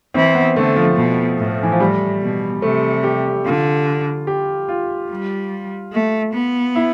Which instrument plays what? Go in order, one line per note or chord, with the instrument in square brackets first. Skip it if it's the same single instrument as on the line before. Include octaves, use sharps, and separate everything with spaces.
[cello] E3 [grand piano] C4
[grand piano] B3
[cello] D3 [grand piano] A3
[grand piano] F3
[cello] B2
A2
[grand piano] E3
F3
[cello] A2 [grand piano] G3
[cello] B2
[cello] C3 [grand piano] A3
[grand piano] G4
[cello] D3 [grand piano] F4
[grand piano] G4
F4
[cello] G3
A3
B3
[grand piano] E4